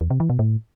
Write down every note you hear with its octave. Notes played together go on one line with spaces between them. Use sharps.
E2
C3
E3
B2
A2